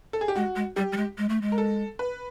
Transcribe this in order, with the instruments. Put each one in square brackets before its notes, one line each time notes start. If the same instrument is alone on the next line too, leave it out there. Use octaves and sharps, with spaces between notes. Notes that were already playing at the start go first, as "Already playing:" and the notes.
[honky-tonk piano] A4
G#4
G4
[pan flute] G#3 [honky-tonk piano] F#4
[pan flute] G#3
[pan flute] G3 [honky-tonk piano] G4
[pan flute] G3
G#3
G#3
A3
G#3
[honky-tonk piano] A#4
A4
B4